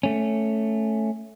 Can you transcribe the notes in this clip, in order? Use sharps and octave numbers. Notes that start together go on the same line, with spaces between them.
A3 C#4